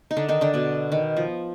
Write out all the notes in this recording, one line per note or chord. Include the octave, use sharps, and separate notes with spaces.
D#4
D3 D4
D#3 D#4
D3 D4
B2 B3
D#3
F3